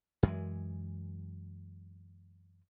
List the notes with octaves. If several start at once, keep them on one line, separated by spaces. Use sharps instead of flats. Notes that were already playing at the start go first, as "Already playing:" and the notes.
F#2 E3 G#3